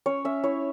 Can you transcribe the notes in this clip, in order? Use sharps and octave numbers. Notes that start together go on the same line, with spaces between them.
C#4 C#5
C#4 E5
E4 C#5